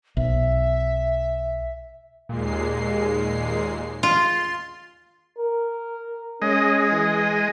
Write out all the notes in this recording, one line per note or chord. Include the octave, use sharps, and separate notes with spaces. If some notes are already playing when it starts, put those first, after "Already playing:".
B1 E5
D#2 A#2 G#3 C7
F4 C6
A#4
G#3 C#4 D#5
E3